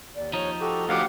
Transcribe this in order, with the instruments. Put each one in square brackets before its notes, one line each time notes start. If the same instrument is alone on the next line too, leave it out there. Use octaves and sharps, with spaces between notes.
[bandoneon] D#2 [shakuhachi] D5
[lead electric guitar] F3 D#4 [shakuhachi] C#5
[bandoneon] F#4 G4 [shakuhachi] A4
[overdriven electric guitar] D2 G4 [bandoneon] F5 F#5